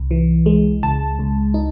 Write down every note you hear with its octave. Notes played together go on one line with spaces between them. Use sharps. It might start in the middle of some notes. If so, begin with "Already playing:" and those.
Already playing: C2
E3
G#3
C#2 A5
C#2
D#4